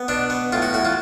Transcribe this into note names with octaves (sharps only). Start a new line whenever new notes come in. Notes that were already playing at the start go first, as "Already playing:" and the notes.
Already playing: B3
B2 D4
B3
A2 F4
F#4
A2 F#4
F4